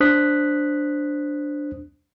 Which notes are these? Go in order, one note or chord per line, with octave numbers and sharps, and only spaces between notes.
D4 C5 D#6 F#6 B6